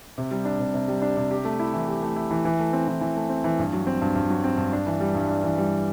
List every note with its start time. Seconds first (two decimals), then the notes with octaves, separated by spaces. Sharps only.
0.18 C3
0.31 G3
0.45 D4
0.59 C3
0.74 C3
0.88 G3
1.02 D4
1.17 C3
1.31 G4
1.45 A3
1.59 E4
1.74 E3
1.88 G4
2.03 A3
2.16 E4
2.31 E3
2.45 E3
2.60 A3
2.73 C4
2.88 E3
3.01 E3
3.16 A3
3.29 C4
3.44 E3
3.59 G2
3.73 F#3
3.87 C4
4.02 G2
4.16 G2
4.30 F#3
4.44 C4
4.57 G2
4.73 D4
4.87 E3
5.00 G3
5.15 G2
5.29 D4
5.44 E3
5.58 G3